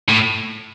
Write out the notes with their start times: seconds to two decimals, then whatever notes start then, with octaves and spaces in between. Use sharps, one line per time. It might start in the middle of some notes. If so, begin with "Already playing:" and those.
0.08 A2